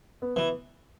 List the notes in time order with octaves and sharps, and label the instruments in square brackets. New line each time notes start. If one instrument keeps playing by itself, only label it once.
[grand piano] B3
[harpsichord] E3 [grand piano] B3